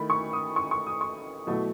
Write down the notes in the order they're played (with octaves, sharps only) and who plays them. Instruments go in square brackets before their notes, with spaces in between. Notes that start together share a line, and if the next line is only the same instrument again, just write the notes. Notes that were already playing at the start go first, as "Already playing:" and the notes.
Already playing: [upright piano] D#3 A3 E4 B5
C#6
D#6
C#6
C#6
D#6
C#6
B2 F#3 A3 E4